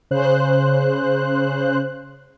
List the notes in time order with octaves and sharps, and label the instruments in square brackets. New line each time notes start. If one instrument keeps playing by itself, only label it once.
[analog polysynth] C#3 C5 F#6